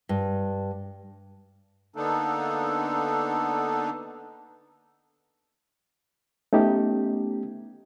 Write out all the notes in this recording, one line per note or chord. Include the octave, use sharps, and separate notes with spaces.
G2
D3 A#3 B3 D4 D#4 A4
A3 B3 C#4 D#4 G4